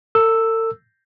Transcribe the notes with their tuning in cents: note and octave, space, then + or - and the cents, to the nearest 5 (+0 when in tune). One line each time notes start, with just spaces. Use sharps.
A4 +45 E6 +0